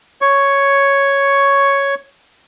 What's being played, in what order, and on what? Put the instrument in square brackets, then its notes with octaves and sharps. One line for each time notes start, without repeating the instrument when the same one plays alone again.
[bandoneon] C#5 C#6